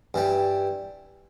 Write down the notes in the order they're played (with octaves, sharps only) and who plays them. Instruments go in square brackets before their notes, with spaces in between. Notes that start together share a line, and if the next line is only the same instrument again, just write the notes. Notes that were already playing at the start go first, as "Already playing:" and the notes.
[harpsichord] G2 E3 G3